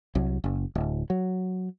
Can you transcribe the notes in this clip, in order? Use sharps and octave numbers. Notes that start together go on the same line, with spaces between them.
C2 F#3
F#1
D1
F#3